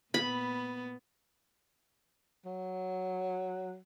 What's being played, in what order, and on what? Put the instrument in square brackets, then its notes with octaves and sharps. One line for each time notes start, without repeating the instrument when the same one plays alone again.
[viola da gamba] A#2 B3 [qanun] B5
[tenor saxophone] F#3